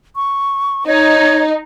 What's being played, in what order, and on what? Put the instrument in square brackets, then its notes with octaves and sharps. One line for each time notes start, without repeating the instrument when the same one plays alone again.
[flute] C#6
[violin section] D#4 [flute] C#5